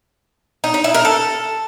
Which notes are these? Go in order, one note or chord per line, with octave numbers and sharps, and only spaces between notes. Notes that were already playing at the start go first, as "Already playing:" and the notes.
D#4
D#4
E4
A#4
A4